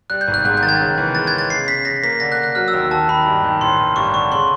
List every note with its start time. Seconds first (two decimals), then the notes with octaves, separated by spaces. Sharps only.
0.10 G3 F#6
0.21 G6
0.28 G#1
0.34 F#6
0.45 G#2 F#6
0.57 G6
0.63 D#3 A6
0.69 G#6
0.80 C#3
0.98 E3
1.15 G#3 A6
1.27 G#6
1.33 C#3
1.38 A6
1.50 C#3 C7
1.68 C#3 B6
1.85 C#3 A#6
2.03 A#3 B6
2.20 D3 A#6
2.32 F#6
2.38 D3
2.44 F#6
2.55 F#3 F6
2.68 E6
2.73 D#2
2.91 D#3 A5
3.09 D#3 B5
3.26 G2
3.44 D#3
3.61 A1 C6
3.79 A1
3.96 G2 C#6
4.14 D3 C#6
4.31 C#3 C6